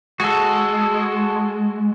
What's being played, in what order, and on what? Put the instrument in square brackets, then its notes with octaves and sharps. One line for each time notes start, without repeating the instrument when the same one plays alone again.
[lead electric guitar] G#3 [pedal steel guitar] F#4 A4